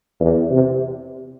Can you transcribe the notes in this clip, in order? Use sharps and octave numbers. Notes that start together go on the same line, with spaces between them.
E2
C3